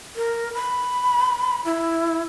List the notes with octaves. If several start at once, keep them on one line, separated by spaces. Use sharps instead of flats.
A#4
B5
E4